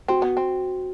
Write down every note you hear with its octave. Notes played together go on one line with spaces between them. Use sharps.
C4 F#4
B3
C4